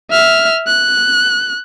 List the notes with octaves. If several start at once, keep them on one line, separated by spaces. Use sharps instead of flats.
E5 F6
F#6